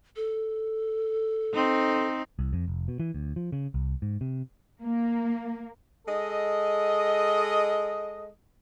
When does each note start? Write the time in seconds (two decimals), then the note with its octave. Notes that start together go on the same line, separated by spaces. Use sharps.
0.16 A4
1.53 C4 D#4
2.39 C2
2.53 F2
2.68 F1
2.88 B2
3.00 E3
3.14 D2
3.36 F3
3.52 C#3
3.74 C2
4.02 G#2
4.21 C3
4.83 A#3
6.07 G#3 A4 D#5